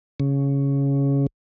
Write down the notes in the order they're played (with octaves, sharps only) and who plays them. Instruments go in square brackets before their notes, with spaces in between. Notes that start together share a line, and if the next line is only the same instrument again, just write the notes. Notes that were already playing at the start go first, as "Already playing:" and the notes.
[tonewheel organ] C#3